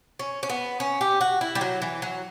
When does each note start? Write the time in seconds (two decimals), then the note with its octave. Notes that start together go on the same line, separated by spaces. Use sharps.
0.19 C#4
0.43 C#4
0.50 B3
0.80 C#4
1.01 G4
1.21 F#4
1.41 E4
1.55 G3
1.61 F#3
1.82 E3
2.02 F#3